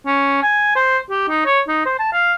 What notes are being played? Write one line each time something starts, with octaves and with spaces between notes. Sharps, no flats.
C#4
G#5
C5
G4
D#4
C#5
D#4
C5
A5
F5